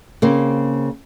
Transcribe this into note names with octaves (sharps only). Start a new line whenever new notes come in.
C#3 A#3 C4